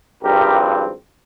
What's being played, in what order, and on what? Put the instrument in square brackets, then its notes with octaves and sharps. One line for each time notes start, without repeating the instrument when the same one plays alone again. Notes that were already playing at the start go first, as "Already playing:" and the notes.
[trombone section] G#1 G2 F3 C4 G4 A#4